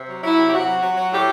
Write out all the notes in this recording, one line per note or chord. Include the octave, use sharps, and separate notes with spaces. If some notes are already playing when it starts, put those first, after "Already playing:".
Already playing: C3
F#3
F#3 E4
C3
G4
C3 F#4
F#3
F#3
F#3
A2 G4